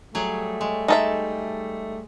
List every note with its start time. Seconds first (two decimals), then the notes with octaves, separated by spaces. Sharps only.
0.15 F#3 G3 A3 G#4
0.61 G#3
0.88 G#3 D#4 A4 E5